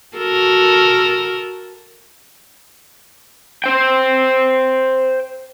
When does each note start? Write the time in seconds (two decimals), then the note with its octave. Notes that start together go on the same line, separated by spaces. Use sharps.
0.17 F#4 A4 A#4
3.64 C5 G5